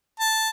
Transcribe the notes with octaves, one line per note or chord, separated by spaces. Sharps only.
A5